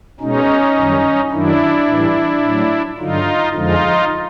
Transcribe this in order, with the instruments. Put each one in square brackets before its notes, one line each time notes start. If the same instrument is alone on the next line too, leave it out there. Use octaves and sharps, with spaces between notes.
[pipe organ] B2 G#3 C#4 D#4
F#2 D#3 G3
F#2 D#3 F#3 D4 E4
A2 E3 G3
A2 F#3
G2 D3 F#3 D#4 F4
F2 D3 F3 G#3 D#4 F4